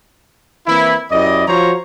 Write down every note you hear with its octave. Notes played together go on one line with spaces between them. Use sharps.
E3 A#3 C4 E4
F#2 E4 G4 D5 D#5
F3 F4 F#4 C5 C#5 A#5